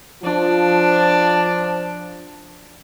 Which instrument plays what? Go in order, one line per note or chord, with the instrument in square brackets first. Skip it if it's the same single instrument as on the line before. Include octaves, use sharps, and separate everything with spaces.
[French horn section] F3 [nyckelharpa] D4